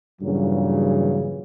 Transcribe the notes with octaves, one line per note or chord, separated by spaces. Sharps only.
G2 A#2 C#3 E3 F#3